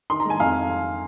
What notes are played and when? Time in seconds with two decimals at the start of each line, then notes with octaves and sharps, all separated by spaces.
0.10 D#3 C6
0.20 A#5
0.25 G#3 G#5
0.40 F2 F5